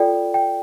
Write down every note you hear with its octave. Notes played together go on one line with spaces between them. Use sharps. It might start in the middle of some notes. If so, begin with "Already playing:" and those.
Already playing: F4 A4 D5 G5
G5